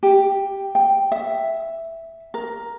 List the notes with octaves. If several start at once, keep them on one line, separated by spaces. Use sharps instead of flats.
G4
G5
E5
A#4